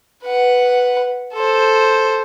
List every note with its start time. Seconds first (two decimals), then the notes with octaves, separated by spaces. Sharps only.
0.24 B4 F#5
1.34 A4 C5